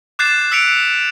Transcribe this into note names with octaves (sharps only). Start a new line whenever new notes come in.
D6 F#6 G6 A6 C7 E7
E6 F#6 B6 C#7 D7 F7